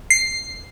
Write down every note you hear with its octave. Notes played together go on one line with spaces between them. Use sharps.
C7